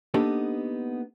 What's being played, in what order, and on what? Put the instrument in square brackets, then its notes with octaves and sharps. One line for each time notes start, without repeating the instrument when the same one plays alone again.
[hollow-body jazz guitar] A#3 B3 D4 D#4 G4 A4